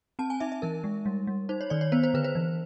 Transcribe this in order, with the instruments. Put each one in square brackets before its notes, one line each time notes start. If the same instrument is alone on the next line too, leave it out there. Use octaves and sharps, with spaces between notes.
[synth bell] C4 A5
G#5
D#4 E5
E5
E3 A#4
G#3
G3
G3
D#4 C5
C#5
D#3 D5
C#5
B3 C5
C5
D3 B4
C5
E3